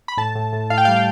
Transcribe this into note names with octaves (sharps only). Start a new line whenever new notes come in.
B5
A2 A5
A2
A2
A2 F5
G5
G3 F5
G5